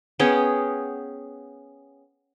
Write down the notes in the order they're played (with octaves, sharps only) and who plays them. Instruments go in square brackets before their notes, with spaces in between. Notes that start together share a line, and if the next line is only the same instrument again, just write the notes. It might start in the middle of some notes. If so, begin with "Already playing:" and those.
[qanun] B3 C#4 G#4 G5